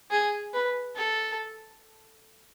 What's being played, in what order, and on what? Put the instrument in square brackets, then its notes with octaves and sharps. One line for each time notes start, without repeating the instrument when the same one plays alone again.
[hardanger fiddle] G#4
B4
A4